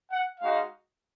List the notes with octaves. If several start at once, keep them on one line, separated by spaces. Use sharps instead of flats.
F#5
G#3 D#4 F#4 F5